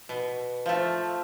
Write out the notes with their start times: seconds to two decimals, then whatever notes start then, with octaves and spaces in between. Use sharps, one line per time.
0.09 B2
0.66 F3 A3